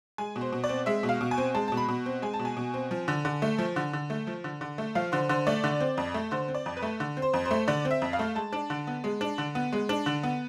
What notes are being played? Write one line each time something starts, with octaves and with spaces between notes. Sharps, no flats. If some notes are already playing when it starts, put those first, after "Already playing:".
G#3 G#5
B2
C5
B2
D5
C4
G#3 E5
B2
F5
B2
G#5
C4
G#3 A5
B2 A5
B5
B2
C4
G#3 G#5
A5
B2
G#5
B2
C4
F3
D3
D3
A3
F3
D3
D3
A3
F3
D3
D3
A3
F3 F5
D3 C5
D3 C5
A3 D5
D3
C4
F2
A3
D3 C5
C4
D5
F2
B4
A3
D3
C4
C5
F2
C5
A3
D3 D5
C4
E5
F2
F5
A3
G#3 A5
D4
D3
B3
G#3
D4
D3
B3
G#3
D4
D3
B3